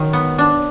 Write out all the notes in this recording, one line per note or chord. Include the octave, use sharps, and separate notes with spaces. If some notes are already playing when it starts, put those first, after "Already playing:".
Already playing: D#3 F#3
B3
D4